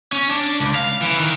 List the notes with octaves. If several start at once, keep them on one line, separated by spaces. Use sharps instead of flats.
C#4
D4
C#2
F5
E3
D#3